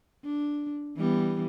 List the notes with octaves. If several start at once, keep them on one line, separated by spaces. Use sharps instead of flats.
D4
E3 G3 B3